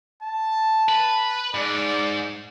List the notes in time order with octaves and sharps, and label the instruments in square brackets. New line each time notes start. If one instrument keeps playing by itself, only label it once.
[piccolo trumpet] A5
[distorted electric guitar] B4
[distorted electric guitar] G#2 [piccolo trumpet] D5